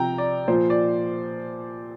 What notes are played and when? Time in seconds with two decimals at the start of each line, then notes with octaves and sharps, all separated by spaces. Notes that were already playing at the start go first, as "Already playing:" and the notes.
Already playing: C3 F3 G5 A#5
0.18 D5
0.48 A#2 F3 C5
0.70 D5